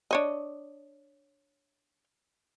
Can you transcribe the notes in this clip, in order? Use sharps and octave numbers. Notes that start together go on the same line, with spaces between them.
D4 C#5 D#5